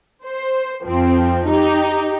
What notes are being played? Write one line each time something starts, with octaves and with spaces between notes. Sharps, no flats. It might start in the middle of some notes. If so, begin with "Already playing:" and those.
C5
F2 F3 C4
D#4 G4